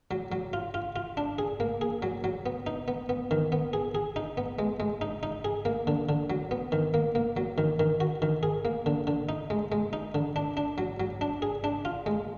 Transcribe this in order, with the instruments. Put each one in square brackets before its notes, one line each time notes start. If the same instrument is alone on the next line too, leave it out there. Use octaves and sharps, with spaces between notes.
[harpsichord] F#3
F#3
F4
F4
F4
D4
G#4
A#3
G#4
F#3
F#3
B3
D#4
B3
B3
D#3
B3
G#4
G#4
D#4
B3
G#3
G#3
D#4
D#4
G#4
A#3
D3
D3
F#3
B3
D#3
A#3
A#3
F#3
D#3
D#3
F#4
D#3
G#4
A#3
D3
D3
D#4
G#3
G#3
D#4
D3
D4
D4
F#3
F#3
D4
G#4
D4
F4
G#3